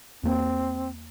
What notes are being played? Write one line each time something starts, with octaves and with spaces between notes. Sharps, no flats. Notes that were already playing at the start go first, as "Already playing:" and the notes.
E2 A#3 C4